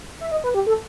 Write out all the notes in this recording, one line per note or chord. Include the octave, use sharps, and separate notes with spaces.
E5
D#5
B4
G4
A4